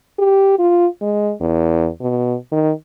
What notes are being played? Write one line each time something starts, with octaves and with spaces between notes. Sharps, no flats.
G4
F4
G#3
E2
B2
D#3